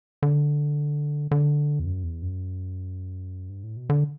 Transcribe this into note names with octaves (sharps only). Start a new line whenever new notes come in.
D3
D3
E2
F#2
E2
F#2
G2
A2
B2
D3